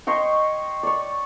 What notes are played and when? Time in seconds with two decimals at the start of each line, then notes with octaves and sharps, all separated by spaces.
0.07 C5 C#5 D#5 G5
0.83 C#5 D5